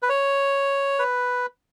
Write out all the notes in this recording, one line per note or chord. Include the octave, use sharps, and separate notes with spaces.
B4
C#5
B4